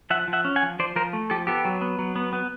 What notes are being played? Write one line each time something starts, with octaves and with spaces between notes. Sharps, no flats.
F3 E5 F#5
F3
E5 F#5
C#4
F#5 G#5
F3
F3 C5 D5
F3 A#4 C5
A3
F3 G4 A4
B3 G4 A4
F#3
B3
F#3
B3
B3